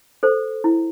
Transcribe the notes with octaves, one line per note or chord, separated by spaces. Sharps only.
A4 C5
E4